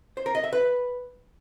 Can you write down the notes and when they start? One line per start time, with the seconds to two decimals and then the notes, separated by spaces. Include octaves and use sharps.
0.17 C5
0.26 A#4
0.35 D#5
0.44 E5
0.53 B4